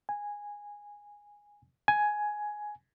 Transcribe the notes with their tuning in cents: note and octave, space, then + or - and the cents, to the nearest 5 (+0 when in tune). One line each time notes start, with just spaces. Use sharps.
G#5 -10
G#5 +10